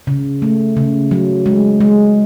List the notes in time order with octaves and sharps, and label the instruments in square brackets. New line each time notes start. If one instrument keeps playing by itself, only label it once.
[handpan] C#3
A3
C#3
F#3
G#3
G#3